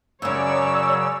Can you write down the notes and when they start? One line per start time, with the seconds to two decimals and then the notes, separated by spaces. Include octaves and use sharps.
0.22 F#2 C#3 F#3 C#4 C#5 D5 E6